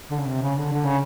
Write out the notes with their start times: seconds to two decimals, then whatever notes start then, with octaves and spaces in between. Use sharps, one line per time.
0.10 D3
0.19 C#3
0.26 C3
0.42 C#3
0.57 D3
0.73 D3
0.85 C#3